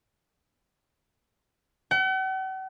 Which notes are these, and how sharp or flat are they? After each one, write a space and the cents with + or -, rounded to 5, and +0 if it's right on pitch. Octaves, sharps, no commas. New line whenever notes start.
F#5 +45